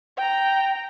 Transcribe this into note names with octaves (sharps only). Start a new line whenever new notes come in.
G5 A#5